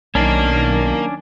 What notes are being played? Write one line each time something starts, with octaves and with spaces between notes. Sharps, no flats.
B1 D#3 F#3 A#3 C#4 D4